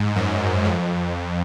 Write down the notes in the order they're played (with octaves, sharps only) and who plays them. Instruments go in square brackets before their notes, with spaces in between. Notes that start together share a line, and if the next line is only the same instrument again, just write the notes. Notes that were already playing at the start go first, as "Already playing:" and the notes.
Already playing: [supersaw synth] G#2
F#2
F2